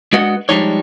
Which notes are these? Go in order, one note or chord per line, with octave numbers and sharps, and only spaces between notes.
G#3 D4 F#4 B4 D#5 F#5
F3 G3 G#3 D4 D#4 C#5